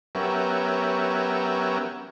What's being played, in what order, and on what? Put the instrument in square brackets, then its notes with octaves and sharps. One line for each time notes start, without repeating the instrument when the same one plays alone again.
[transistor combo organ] F#3 B3 C#4 G4 A#4 E5